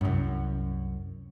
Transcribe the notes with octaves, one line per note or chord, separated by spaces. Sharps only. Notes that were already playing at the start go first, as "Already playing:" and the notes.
C2 F#2